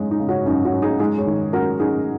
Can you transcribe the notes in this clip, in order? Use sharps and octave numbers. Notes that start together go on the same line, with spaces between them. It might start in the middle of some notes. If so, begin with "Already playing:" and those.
Already playing: F#2 C#3 G#3 C#4 D#4
D#4
C#3
C#4 F#4
F#2 D#4
C#4 F#4
F#2
D#4 G#4
G#3 D#4 G#4
G#4 C#5
D#3
F#2 F#4 A#4
F#2 D#4 G#4